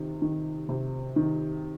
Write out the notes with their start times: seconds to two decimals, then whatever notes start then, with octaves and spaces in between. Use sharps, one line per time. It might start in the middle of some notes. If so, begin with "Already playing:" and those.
Already playing: C3 D#3
0.22 D#3
0.69 C3
1.16 D#3